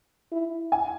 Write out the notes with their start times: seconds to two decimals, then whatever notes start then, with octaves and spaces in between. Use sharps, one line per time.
0.32 E4
0.72 G#5